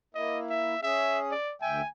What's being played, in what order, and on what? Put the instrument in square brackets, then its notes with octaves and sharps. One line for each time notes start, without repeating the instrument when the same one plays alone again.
[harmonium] A#3 E4 [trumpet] D#5
[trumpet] E5
[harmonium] C#4 G#4 [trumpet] E5
[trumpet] D5
[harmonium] D2 E5 G5 [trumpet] G#5